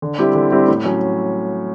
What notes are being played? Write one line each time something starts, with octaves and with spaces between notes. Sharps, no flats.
D3
G3 C4 E4 G4
D3
G3 C4 E4 G4
A2
F#3 C#4